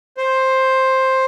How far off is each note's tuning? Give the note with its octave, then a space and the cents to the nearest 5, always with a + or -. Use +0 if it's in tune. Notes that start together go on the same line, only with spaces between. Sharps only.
C5 +10